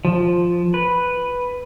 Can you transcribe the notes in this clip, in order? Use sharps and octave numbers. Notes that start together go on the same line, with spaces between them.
F3
B4